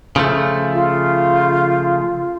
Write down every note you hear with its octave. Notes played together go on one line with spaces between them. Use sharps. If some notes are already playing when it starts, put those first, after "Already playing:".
C#3 F3 A3
F4